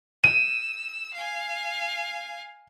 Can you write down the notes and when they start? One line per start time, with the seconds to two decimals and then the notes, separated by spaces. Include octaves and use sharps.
0.24 E6 D#7
1.14 F5 G#5